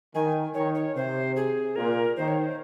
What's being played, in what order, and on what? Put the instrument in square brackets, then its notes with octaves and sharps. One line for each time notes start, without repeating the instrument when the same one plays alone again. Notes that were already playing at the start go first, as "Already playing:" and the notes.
[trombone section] D#3 [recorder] G#5
[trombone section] D#3 [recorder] C#5
[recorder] C#5
[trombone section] C3 [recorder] C5
[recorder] G#4
[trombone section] A#2 [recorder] A#4
[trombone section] D#3 [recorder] C5
[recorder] C#5
C5